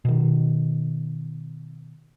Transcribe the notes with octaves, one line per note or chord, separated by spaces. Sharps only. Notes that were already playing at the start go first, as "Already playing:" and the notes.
B2 D#3